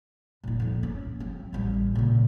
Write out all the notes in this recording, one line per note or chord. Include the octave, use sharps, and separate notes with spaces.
A#2 D#4
F2 A#2
C#4
F#3 C4
A1 G3
A#2 C#3